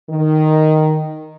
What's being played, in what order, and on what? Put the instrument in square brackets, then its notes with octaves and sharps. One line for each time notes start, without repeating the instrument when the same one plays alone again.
[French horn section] D#3